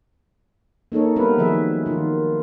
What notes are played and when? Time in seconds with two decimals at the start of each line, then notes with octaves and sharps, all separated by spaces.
0.92 A#3 D#4 A4 C#5
1.16 G3 B3 C4 E4 A#4 B4
1.38 D#3 F3 F#3 G#4 E5
1.86 D#3 F4